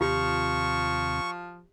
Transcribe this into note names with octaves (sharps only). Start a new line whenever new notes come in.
D#2 C3 F3 F4 G4 C#6